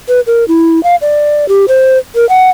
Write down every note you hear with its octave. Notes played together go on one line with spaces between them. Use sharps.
B4
A#4
E4
F5
D5
G4
C5
A#4
F#5